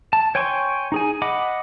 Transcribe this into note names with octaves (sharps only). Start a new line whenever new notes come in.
A5
C#5 G5 G#5 C6 C#6
D#4 G#4 G#5
D#5 F#5 B5 D6